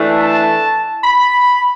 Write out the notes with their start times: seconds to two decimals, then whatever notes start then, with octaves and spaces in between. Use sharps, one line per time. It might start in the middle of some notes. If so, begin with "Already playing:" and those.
Already playing: E3 A3 D4
0.20 A5
1.04 B5